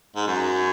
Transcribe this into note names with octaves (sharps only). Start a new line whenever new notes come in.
G#2
F#2